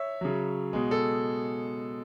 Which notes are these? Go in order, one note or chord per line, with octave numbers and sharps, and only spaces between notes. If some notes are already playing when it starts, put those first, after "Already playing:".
Already playing: C#5 E5
C#3 F#3
B2 G#3
A4